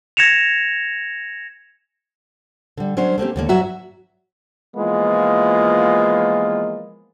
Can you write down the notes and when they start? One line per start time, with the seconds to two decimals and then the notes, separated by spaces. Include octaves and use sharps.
0.17 G#6 A#6 C#7 E7 F7
2.77 D3 G3
2.97 F#3 C#4 D4 C5
3.18 A3 A#3 C4 G4
3.36 D#2 D3 A#3
3.49 G2 F#3 F#4 E5 A#5
4.76 E3 F3 G#3 A#3 B3 F4